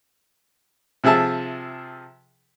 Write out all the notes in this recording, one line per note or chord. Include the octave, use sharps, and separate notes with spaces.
C3 F3 G#4 E5 A5